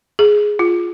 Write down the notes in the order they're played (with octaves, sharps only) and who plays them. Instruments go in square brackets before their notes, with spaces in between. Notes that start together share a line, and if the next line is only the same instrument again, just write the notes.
[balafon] G#4
F4